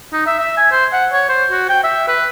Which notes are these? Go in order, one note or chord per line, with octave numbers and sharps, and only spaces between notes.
D#4
E5
E5
G#5
C5
F#5
C#5
C5
F#4
G5
E5
B4